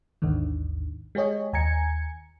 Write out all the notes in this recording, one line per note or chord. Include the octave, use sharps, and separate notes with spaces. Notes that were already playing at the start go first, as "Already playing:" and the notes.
A1 D#2 G#2 D3 D#3
G#3 G4 G#4 C#5 D#5
D#2 G#5 A#5 G#6 C#7